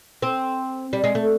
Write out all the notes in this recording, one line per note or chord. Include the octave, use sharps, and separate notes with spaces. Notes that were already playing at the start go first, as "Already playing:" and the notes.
C4
G3
G#3
A3